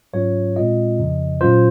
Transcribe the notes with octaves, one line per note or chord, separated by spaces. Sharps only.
G#2 F#3 C#4 F4 C#5
A#2 G#3 C4 F4 D#5
F2 C#3 F3
A#2 F#3 C#4 F4 C5